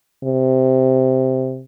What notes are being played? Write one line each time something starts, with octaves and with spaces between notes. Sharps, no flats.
C3